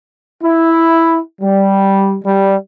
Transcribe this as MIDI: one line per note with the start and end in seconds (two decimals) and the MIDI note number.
0.43 1.19 64
1.41 2.17 55
2.24 2.54 55